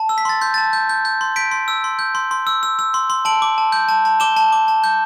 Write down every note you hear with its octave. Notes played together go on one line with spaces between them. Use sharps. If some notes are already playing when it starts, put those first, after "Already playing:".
Already playing: A5
E6
B6
C6 A6
C6 G6
A5 A6
G6
G6
G6
C6
G6 B6 D7
C6
E6
C6
G6
C6
C6
E6
E6
E6
C6
C6
A5 D7 F#7
D6
A5
G6
A5
A5
D6 E7 G7
A5
D6
A5
G6